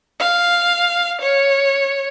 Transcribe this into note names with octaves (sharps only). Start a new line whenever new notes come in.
F5
C#5